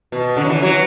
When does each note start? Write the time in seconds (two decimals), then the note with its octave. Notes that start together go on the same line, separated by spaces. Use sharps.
0.12 B2
0.37 D3
0.44 F#3
0.49 E3
0.62 F#3